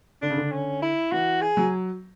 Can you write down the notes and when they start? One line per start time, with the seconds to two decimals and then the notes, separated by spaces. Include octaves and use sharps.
0.22 D3 D4
0.30 C#3
0.37 D3
0.52 C#4
0.82 E4
1.12 E3 F#4
1.41 G#4
1.57 F#3